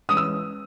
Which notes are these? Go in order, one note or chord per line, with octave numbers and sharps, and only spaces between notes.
E3 G#3 C#4 D#6
E6